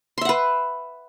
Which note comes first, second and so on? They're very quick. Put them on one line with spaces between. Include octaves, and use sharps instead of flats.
C6 E5 F#5 B4